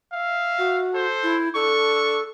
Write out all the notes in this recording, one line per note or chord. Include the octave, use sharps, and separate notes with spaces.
E5 F5
F#4
A4 C5
E4
D4 A4 C#6